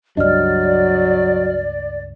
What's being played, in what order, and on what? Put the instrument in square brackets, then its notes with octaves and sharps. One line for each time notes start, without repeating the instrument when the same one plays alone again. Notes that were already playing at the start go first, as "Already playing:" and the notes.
[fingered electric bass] C#2 G2 D4 [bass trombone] F#3 [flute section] D5 [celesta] D#5 F6